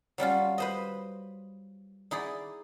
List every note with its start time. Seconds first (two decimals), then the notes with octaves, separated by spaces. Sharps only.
0.18 F#3 G3 C#4 F4
0.58 B4 C5 D#5
2.11 D#4 E4 G#4 D5